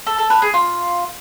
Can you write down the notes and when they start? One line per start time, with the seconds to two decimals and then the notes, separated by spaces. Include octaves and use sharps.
0.07 A4
0.18 A4
0.30 B4
0.42 G#4
0.54 F4